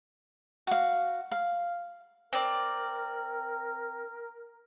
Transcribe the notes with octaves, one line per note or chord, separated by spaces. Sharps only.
F#4 F5
F5
C4 A#4 D5